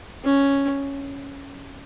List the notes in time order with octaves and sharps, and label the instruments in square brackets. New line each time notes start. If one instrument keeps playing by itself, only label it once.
[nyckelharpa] C#4